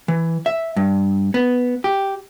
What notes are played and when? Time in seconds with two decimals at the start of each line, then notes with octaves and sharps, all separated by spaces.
0.08 E3
0.46 E5
0.76 G2
1.34 B3
1.84 G4